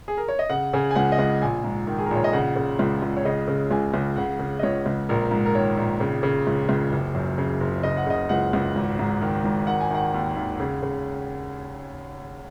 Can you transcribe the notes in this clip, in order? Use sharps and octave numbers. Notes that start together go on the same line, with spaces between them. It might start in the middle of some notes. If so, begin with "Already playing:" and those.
G#4
A#4
C#5
D#5
C#3 F#5
C#3 G#5
G#5
C#2 F#5
D#5
C#2 F#5
A#1 G#5
G#2
D#3
G#4
A#4
A#1 C#5
D#5
C#3 F#5
C#3
C#2
C#2
C#5
C#3 D#5
C#3
C#2 G#5
C#2
C#3 F#5
C#3
D#5
C#2 C#5
C#2
A#1 A#4
G#2
A#4
D#3 C#5
A#1
C#3
C#3
C#2
C#2
F#1
F#2
C#3
F#1
C#3 D#5
F#5
C#3 D#5
C#2 F#5
C#2
G#1
G#2
D#3
G#1
D#3 F#5
G#5
D#3 F#5
D#2
D#2
C#3
C#3